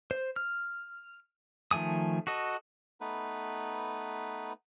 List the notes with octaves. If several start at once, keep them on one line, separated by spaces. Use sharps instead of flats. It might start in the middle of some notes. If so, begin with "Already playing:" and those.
C5
F6
D#3 F3 A3 G#5 D#6
F#4 A4 D#5
A3 B3 D#4 B4